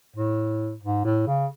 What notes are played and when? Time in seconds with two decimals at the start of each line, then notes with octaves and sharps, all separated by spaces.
0.16 A2
0.83 G#2
1.04 A2
1.27 C#3